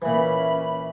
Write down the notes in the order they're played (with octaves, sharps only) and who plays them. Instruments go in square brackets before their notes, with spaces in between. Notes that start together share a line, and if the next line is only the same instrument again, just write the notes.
[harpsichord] A#2 E3 [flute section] C#4 E5 B5